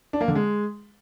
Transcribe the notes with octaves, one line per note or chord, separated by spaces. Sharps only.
D4
A#3
D3
G#3